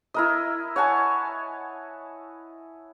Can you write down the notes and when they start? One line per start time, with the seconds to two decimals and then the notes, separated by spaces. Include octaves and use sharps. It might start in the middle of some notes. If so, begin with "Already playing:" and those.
0.14 E4 A#4 D#5
0.76 C#5 F#5 G#5 A5